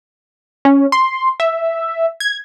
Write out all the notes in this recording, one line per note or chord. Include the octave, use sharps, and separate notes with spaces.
C#4
C6
E5
G#6